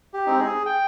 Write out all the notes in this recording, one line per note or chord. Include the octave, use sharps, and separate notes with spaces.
G4
G#3 C4 D#4
G#4
G5